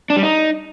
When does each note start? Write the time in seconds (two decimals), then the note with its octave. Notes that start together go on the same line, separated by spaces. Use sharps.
0.10 D4
0.16 G3
0.23 D#4